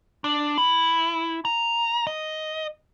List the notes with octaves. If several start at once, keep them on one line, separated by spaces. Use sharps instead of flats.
D4
E4
A#5
D#5